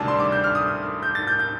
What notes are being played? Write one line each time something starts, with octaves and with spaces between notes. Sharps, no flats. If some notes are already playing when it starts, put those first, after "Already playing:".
Already playing: D2 C3 D#3 G3 D4 A5
C6
D6
G6
F6
D#6
G6
A6
G6
G6